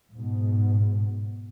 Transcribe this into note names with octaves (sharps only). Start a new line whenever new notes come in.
G#2 B2